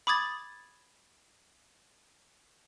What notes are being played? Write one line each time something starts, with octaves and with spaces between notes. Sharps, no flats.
B5 D6 D#6 G#6 A6